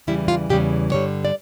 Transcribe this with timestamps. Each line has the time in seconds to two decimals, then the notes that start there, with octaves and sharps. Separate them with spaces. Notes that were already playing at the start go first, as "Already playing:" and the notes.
0.07 E2 C#3 E3 G3 E4
0.28 F4
0.50 E2 C#3 E3 G3 G4
0.92 G2 D3 G3 C#5
1.25 D5